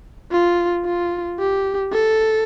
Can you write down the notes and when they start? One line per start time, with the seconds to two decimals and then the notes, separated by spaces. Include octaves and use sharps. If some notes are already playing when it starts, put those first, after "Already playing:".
0.32 F4
0.85 F4
1.39 G4
1.93 A4